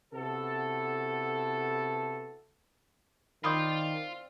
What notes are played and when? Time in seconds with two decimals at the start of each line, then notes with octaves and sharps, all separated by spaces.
0.13 C3 B3 E4 F#4 A4
3.44 D#3 C4 F4 D5 B5 C6 D#6 G6